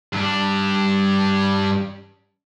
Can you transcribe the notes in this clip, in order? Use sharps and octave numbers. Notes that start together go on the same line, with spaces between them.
G2 D4